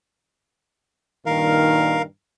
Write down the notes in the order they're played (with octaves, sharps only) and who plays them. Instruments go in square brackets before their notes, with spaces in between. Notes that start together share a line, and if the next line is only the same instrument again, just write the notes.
[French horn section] G2 A#2 D#3 [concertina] A#4 F5